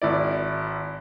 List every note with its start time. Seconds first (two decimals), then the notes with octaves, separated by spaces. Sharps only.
0.02 G#1 E4 D5